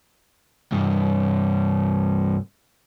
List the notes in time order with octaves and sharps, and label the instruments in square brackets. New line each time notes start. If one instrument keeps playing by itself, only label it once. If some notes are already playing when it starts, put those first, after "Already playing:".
[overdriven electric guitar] C2 G2